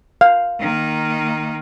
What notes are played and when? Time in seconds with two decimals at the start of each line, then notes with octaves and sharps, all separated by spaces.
0.21 F5
0.60 D#3 A#3